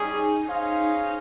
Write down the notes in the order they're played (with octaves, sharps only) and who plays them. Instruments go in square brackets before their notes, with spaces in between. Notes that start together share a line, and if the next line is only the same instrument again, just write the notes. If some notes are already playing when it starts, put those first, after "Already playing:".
Already playing: [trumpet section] G3 C#4 G#4 [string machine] D#4
[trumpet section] C#4 G#4 C5 F5 [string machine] D#4